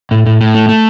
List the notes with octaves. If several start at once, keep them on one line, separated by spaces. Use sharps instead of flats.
A2
A2
A2
A3
A3